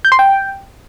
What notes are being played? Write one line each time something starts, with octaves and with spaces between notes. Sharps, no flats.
G6
C6
G5